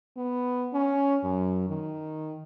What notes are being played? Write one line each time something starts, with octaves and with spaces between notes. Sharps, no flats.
B3
C#4
F#2
D#3